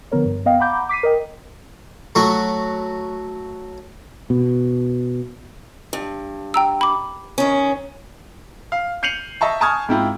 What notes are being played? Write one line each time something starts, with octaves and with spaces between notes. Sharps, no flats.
D3 F3 B3 A#4 C#5
G2
B3 D#5 F5 G5
F#5 A#5 B5 D6 G6
D6 B6 C7 D#7
A#4 D#5 G5
F#3 A3 F#4
B2
G2
G5 A#5 E6
B5 D6
D#3 C#4
F5
G6 C7 C#7 D#7 F7 F#7
D#5 E5 A5 C#6
G#5 A5 C#6 D#6 F6 G#6
G#2 C4 E4 F4